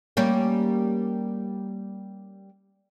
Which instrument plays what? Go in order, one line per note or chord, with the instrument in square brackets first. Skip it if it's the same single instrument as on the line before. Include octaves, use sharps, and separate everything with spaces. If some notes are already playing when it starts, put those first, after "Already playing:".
[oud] G3 A#3 C#4